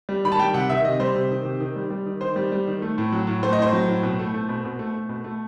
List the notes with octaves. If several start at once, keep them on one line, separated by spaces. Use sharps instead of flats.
G3
D#3 B5
A5
G3 G5
C3 F#5
D#3 E5
C3 D#5
G3 C5
C3
D#3
C3
D#3
G3
G3
D#3
D#3 C5
G3
G3
D#3
A3
A2
F#3
A2
A3 C5
D#5
A2 C5
F#3
A2
B2
A3
A3
B2
B2
A3
A3
B2
A3